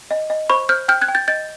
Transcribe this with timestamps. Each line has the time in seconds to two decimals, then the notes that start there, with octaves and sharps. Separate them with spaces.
0.11 D#5
0.30 D#5
0.50 C5 B5 C#6
0.69 C5 F6 G6
0.88 G5 F6 G6
1.01 F#6 G#6
1.08 G5
1.15 G6 A6
1.28 D#5 G6 A6